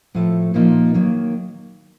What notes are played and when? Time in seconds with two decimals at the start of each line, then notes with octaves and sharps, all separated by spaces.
0.15 A2 F3 A3
0.54 A#2 F3 A#3 D#4
0.94 D#3 F#3 A#3